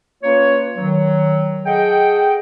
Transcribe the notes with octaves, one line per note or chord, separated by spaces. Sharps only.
A#3 C#4 F4 B4 C#5
D#3 F#3
G#4 A4 D#5 F#5 G5